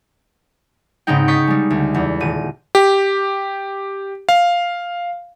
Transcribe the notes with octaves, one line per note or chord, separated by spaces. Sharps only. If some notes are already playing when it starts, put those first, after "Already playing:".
G#2 C#3 B3 C4 D#4 G5
C#6 D#6 G6 A6 B6 C#7
G3 G#3
D2
E2
D#1 D#7
G4
F5